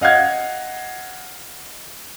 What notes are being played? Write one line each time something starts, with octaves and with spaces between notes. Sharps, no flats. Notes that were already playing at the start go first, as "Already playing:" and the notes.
D#5 F5 F#5 G#6